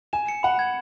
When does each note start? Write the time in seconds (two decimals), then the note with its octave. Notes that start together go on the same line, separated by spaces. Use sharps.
0.13 G#5 E7
0.28 C#7
0.43 F#5 B5
0.59 G#6